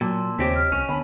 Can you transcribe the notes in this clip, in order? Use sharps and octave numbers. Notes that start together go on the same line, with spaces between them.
A#2 F#3 A5 C6 E6
D#2 C#3 C4 G4 C#5 D#5 B6
F6
C2 C#4 C#5
D3 B3 G#5 A5 B5